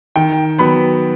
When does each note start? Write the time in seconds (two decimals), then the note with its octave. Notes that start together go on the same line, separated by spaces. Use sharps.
0.16 D#3 G5
0.58 F#3 B3 B5